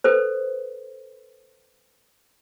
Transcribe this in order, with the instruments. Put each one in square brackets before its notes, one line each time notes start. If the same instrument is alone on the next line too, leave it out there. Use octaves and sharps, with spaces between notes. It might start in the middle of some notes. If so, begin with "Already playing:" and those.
[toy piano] A4 B4 C5